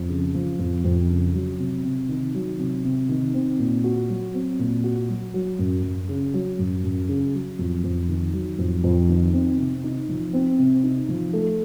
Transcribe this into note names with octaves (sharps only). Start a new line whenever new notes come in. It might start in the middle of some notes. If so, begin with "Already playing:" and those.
Already playing: F2
C#3
F3
F2
F2
C#3
F#3
C3
C3
D#3
F#3
C3
C3
D#3
C4
A#2
F#4
F#3
C4
A#2
F#4
F#3
F#3
F#2
F#2
C#3
F#3
F#2
F#2
C#3
F#3
F2
F2
D#3
F#3
F2
F2
D#3
C4
C3
D#4
F3
C4
C3
D#4
F3
A3